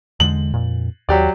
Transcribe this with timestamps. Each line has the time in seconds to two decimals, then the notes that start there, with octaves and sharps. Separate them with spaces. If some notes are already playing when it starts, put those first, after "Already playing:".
0.20 E2 D3 G#3 F#7
0.54 F2 A#2
1.09 D#2 F#3 G4 D5